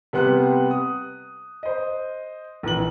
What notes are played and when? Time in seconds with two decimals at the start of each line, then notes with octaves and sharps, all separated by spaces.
0.13 C3 G3 B3 F#5 C6 F#6
0.71 D#6
1.63 C5 D#5
2.63 A#1 E3 F#7